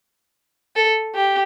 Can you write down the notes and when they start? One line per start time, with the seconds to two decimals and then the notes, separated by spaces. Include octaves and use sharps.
0.76 A4
1.15 G4